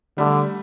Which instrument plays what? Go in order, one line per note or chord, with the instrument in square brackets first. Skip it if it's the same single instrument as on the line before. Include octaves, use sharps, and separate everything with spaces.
[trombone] D3 [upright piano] G3 A3